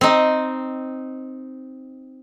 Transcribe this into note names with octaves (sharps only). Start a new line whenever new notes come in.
C4 D#4